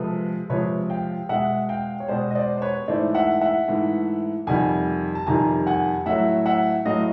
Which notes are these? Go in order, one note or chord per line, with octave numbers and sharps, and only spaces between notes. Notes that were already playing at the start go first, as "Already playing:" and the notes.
Already playing: C3 F3 G#3 A4 B4
C3 F3 G#3 B4 C#5
F5 G5
B2 G#3 E5 F#5
F5 G5
C#5
B2 G#3 C5 D5
D#5
C5 D5
C5
B4 C#5
G#2 E3 A3 C5 D5
E5 F#5
E5 F#5
G#2 E3 A3
F2 C3 D#3 G3 F#5 G#5
A5
F2 C3 D#3 G3 G#5 A#5
F#5 G#5
A2 F#3 A3 E5 F#5
E5 F#5
A2 F#3 A3 D#5 F5